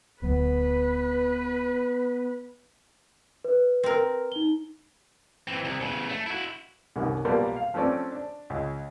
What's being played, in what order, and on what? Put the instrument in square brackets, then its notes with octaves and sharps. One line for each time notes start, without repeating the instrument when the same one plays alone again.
[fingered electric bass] D1 D2 F#3 [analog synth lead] B3 [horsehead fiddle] B4
[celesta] B4
[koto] C4 A#4
[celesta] D#4 G7
[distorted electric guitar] E3 C4
C2
E2 C#3
A3
E4 F#4
[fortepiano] C2 F#2 D#3
B1 F3 G3 A#3 A#4 C6
F5
F3 A3 C4 C#4 D5
D4
C#2